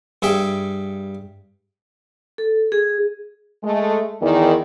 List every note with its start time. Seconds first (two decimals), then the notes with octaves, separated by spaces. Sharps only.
0.22 G2 G#4 E5 G5
2.38 A4
2.72 G#4
3.63 G#3 A3
4.21 E2 D#3